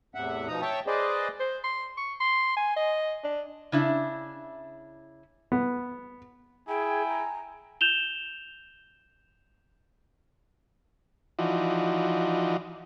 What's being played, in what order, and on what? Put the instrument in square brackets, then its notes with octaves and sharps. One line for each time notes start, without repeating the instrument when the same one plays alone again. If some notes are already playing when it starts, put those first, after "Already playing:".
[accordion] E2 A2 C3 E5 F#5
B2 F3 D#4 A#5 D#6
C#5 E5 G5 A5
G#4 B4 C5 D5 D#5
[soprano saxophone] C5
C6
C#6
C6
G#5
D#5
D4
[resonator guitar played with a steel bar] C#3 D4 E4
[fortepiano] B3
[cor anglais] E4 [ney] G#4 [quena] G5 [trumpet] G#5
[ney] A#5
[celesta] G6 E7 F7 G7
[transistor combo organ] E3 F3 D#4 F#4 D5